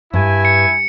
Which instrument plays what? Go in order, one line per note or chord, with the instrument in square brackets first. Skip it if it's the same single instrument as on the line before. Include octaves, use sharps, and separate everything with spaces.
[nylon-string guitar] G2 [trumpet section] E4 G#5
[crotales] C#7